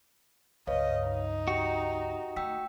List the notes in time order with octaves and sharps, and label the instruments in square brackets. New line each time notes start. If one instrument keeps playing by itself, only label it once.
[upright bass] C#2 G2 [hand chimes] B4 C#5 F5 [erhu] D#5
[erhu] D#4
[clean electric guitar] F#4 [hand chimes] G4 G5
[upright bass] A3 [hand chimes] G5 E6 B6